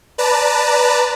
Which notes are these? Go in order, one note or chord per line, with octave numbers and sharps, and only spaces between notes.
B4 D5 A5 A#5